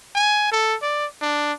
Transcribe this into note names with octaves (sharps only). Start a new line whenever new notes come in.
G#5
A4
D5
D4